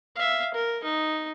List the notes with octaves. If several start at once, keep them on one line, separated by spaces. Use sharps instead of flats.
E5 F5
A#4
D#4